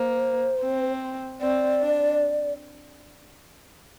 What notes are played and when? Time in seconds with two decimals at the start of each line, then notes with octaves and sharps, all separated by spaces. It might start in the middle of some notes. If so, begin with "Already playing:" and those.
Already playing: A#3 C5
0.62 C4
1.41 C4 D5
1.81 D4